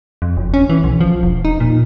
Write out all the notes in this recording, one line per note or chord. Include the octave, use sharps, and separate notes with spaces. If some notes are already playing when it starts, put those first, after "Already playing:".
F2
F#1
C#4
E3
B1
F3
E1
D#4
A#2